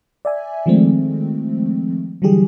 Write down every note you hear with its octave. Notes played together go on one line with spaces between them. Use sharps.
D5 E5 G#5
D#3 F3 G#3 A3 C4
D3 E3 F#3 G3 G4 G#4